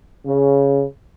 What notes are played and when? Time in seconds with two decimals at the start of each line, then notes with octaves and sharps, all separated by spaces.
0.26 C#3